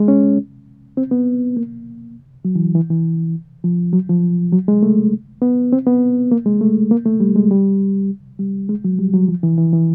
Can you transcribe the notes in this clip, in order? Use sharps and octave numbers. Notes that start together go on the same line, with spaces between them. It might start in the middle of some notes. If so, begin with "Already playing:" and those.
Already playing: G#3
C#4
C4
B3
A#3
F#3
E3
E3
E3
F3
F#3
F3
F#3
G#3
A3
B3
C4
B3
A#3
G#3
A3
A#3
A3
G3
G#3
G3
G3
G#3
F#3
G3
F#3
F3
E3
E3
E3